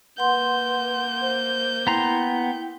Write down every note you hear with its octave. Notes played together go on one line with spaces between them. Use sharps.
A#3 B4 F#5 C6 G6
C5
B3 E4 G5 A#5 C6